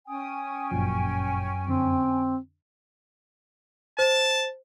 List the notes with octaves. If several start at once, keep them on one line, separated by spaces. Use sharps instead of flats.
C#4 G5 G#5 D#6
G1 F#2 A#2 F3
F2 D3 C4
C5 A5